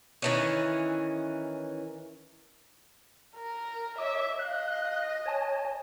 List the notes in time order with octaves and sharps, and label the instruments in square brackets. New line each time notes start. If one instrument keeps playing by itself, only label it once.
[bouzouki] D#3 E3 C#4
[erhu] A#4
[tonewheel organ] C#5 D#5 D6 [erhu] E5
[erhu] D#5 [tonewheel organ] F5 F#6
[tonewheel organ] C#5 G#5 A5